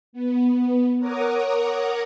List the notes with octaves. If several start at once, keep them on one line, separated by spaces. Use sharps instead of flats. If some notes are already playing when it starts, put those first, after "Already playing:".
B3
A#4 C#5 F#5 A#5 D6 D#6